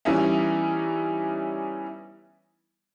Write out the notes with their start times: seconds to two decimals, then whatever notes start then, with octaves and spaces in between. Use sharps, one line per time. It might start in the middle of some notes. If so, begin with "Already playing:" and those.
0.05 E3 G3 B3 C#4 D#4 E4